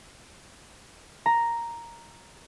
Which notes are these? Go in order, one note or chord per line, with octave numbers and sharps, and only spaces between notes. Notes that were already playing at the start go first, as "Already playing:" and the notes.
A#5